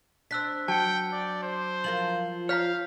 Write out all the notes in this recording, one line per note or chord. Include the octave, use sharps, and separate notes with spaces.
C4 D4 E6 F#6 B6
F#3 G5 A5 C#7
D5
C5
F3 F4 A#4 F#7
C#5 F5 A#5 F6 G6 B6